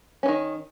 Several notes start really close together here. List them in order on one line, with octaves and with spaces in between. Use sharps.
C#4 E3 D#3